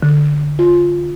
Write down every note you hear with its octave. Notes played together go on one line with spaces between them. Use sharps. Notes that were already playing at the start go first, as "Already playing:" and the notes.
D3
F4